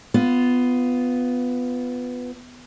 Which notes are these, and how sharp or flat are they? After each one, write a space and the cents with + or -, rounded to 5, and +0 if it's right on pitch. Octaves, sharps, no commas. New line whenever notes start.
B3 +10 F4 +0